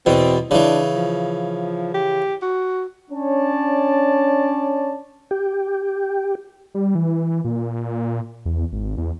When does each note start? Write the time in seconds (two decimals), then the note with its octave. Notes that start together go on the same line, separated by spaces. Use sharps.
0.06 E2 B2 C4
0.51 C#3 E3 D4
0.95 F3
1.94 G4
2.42 F#4
3.11 C#4 D4 C#5 D5 A5
5.31 G4
6.75 G3
6.95 E3
7.45 A#2
8.45 E2
8.72 G#1
8.97 E2